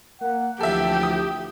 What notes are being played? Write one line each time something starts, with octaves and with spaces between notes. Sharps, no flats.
A#3 F#5
D2 E3 F3 G4 A4 E5
D#6